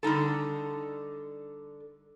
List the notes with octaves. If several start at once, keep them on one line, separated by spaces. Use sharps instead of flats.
D3 G3 D#4 A4